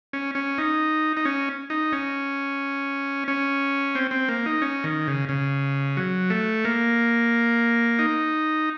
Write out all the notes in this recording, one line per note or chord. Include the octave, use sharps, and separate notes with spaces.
C#4
C#4
D#4
D#4
C#4
D#4
C#4
C#4
C4
C4
A#3
D#4
C#4
D#3
C#3
C#3
F#3
A3
A#3
D#4